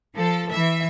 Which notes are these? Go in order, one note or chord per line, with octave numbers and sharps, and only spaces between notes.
F3 A4
E3 E5